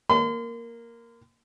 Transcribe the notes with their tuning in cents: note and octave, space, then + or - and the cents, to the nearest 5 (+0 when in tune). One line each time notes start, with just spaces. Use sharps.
A#3 +0 C6 -40